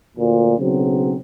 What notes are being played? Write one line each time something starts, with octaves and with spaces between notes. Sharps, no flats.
D2 A#2
B1 C#3 F#3 C4